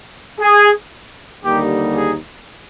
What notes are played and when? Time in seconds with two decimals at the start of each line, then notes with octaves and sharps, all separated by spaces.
0.40 G#4
1.44 D#2 D3 G3 A#3 D#4 G4
1.96 G#4